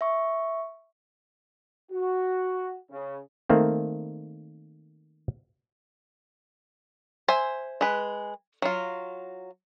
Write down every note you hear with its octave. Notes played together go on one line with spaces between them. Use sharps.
E5 C#6
F#4
C#3
D#3 A3 A#3 C4
C5 E5 G#5
G#3 B4
F#3 F4